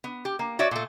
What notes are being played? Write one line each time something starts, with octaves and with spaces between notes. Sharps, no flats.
B3
G4
A#3
F#4 C#5 D5 E5
A#2 A3